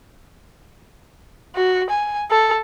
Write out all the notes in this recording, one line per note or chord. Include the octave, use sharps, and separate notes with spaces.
F#4
G#5
A4